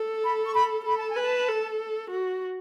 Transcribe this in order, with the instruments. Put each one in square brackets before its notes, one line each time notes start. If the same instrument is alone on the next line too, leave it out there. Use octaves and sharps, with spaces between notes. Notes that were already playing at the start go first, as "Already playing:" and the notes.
Already playing: [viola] A4
[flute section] B5
C#6
B5
[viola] A4 [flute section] B5
[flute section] A5
G#5
[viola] B4
[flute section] A5
[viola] A4
F#4